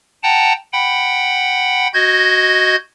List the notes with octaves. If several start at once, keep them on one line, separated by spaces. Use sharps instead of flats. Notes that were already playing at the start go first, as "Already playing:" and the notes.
F#5 G5 A5 A#5
F#5 G5 B5
F#4 D#5 G6 G#6